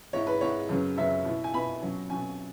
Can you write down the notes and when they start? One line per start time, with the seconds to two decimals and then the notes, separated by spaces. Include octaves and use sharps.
0.13 G#2 G#3 E4 C#5
0.27 B4
0.41 G#2 G#3 E4 C#5
0.69 F#2 C#3 F#3 B3
0.97 F#2 C#3 F#3 B3 E5
1.25 B2 B3 E4
1.44 G#5
1.54 B2 B3 E4 B5
1.82 B2 F#3 C#4
2.10 B2 F#3 C#4 G#5